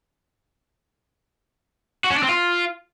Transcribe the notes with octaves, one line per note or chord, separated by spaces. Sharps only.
F#4
C#4
D4
C4
F4